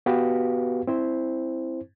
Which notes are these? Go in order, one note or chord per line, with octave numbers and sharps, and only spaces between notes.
B3 F#4 G4 B4 F5
C4 E4 C5